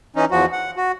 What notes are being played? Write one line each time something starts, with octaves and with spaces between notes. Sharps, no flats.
E3 C#4 D#4
E2 F3 F#4
F#5
F#4